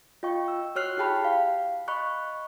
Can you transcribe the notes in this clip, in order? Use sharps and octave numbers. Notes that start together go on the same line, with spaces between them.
F4 D#5 G5 C#6
E6
F#4 C#5 F6 F#6 C7
E4 G4 G#4 G5 A5 B5
F5
D#5 B5 C#6 F#6